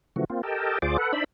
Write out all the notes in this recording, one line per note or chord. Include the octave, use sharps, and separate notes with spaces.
C#3 E3 F3 A3 F#4
A#3 C4 F4
G4 A4 A#4 D#5 G5 A5
D2 F4 G#4 C5 D5 D6
A4 B4 F#5
D4 D#4 C5 D5 E5 B5